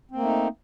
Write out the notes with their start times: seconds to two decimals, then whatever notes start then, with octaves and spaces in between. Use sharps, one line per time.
0.11 C4
0.16 A#3
0.20 A3
0.24 D#4